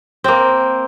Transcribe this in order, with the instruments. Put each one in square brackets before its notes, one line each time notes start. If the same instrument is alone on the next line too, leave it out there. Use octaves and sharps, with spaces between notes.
[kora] A#3 C4